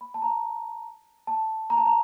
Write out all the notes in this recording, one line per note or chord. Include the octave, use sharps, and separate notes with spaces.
B5
A5
A#5
A5
A#5
A5
A#5